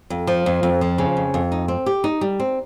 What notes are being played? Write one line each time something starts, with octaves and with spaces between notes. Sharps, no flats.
F2
F3
F2
F2
F3
C#3
F2
F2
D#4
C4
G4
D#4
G3
C4